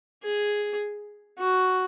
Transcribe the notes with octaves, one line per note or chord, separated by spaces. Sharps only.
G#4
F#4